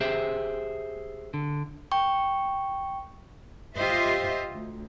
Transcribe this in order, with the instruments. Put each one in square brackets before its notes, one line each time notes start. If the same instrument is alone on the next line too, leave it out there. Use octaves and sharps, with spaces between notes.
[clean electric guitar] G4 G#4 C5 E5
D3
[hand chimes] G5 C#6
[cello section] F4 G4 C5 D#5 E5
D2